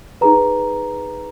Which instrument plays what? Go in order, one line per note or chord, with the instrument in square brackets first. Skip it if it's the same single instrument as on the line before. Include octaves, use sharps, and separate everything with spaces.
[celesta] D#4 G#4 B4 A#5